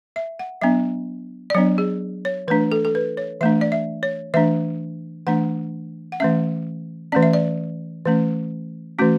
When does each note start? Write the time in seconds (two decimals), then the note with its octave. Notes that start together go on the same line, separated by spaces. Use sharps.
0.16 E5
0.39 F#5
0.61 F#3 B3 D4 E5
1.50 D5
1.54 F#3 B3 D4 C#5
1.78 G#4
2.25 C#5
2.48 E3 A3 D4 B4
2.72 A4
2.85 A4
2.95 B4
3.17 C#5
3.41 E3 A3 D4 E5
3.61 D5
3.72 E5
4.03 C#5
4.34 E3 A3 D4 E5
5.27 E3 A3 D4 F#5
6.12 F#5
6.20 E3 A3 C#4 E5
7.12 E3 A3 C#4 D5
7.23 E5
7.33 D5
8.05 E3 A3 C#4
8.99 E3 A3 C#4 F#4